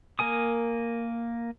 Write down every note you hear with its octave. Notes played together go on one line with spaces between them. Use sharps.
A#3 A#4 G#5 D#6